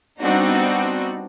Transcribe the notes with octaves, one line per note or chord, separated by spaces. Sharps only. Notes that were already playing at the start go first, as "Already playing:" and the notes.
G3 B3 C4 D4 D#4 F#4